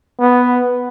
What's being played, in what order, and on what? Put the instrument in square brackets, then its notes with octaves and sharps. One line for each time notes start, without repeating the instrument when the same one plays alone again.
[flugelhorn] B3